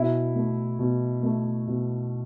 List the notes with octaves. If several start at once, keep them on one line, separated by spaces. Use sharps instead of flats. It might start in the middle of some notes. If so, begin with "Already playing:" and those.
Already playing: B2 E4
A3
B2
A3
B2